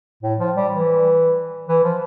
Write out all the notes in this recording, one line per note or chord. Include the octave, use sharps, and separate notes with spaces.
A2
F3
G3
E3
E3
F3